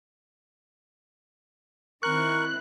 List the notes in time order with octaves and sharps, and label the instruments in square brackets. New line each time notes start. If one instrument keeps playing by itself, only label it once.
[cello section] D#3 C4 E4 [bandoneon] A#4 [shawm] C#6 [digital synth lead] F#6